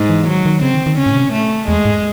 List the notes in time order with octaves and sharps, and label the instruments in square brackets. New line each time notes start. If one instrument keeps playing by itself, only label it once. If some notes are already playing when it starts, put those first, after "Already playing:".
Already playing: [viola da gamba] G#2
[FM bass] E3
[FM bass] D#3 [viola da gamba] F#3
[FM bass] D#3
[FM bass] C#3 [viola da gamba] C4
[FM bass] D#3
D#3
[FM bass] C#3 [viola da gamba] C#4
[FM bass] A2
C3
[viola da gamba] A3
[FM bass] E2 [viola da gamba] G#3
[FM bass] G#2